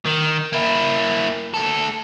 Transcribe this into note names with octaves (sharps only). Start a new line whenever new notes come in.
D#3
A#3 E4
D2 A4